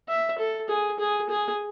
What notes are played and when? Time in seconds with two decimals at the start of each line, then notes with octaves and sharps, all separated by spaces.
0.09 E5
0.39 A4
0.69 G#4
0.99 G#4
1.29 G#4